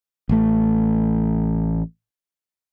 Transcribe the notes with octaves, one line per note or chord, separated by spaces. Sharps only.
A1 A3